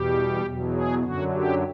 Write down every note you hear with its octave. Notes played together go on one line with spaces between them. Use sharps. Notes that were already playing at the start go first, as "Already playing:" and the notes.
Already playing: E2 B2 G3 G4
E2 B2 F#3
G#4
F#2 D3 F#3 F#4
G4